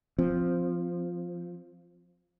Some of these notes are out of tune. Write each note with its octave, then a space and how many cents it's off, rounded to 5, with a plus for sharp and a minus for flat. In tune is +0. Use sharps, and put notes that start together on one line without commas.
F3 +0 C4 -5